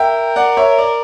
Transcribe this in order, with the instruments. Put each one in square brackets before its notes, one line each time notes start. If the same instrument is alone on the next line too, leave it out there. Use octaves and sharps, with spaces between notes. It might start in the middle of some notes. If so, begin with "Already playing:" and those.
Already playing: [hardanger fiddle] A#4 [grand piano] E5 G5
[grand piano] D5 F#5
C#5 E5
D5